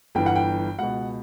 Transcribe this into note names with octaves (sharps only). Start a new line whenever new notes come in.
G1 G2 E3 G5
F#5
G5
C#2 B2 F#5